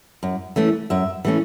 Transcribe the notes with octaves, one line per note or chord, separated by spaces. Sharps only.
F#2
E3 A3 C#4
F#2 E5
E3 A3 C#4